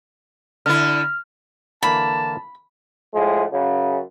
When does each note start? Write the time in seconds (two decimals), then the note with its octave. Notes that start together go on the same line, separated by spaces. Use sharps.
0.66 D3 E4 F6
1.83 D3 E3 A#3 A5 B5
3.14 A2 F3 G#3
3.51 F#2 C#3